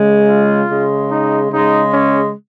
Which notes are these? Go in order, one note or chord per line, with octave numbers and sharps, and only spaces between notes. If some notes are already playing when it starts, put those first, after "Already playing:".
Already playing: C#3 G#3
F4
C#3 G#3
D#4
C#3 G#3 D#4
C#4